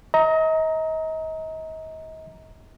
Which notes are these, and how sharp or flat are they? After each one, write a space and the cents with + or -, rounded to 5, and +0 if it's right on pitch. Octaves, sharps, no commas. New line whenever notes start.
D#5 +35 A#5 +0